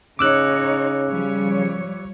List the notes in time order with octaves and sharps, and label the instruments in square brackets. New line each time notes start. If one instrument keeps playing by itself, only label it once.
[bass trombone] C#3 [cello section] D#4 C#5 [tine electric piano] D6 E6 F#6
[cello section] F3 G3 C#5